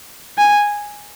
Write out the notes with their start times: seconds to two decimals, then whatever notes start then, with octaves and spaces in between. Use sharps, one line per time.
0.38 G#5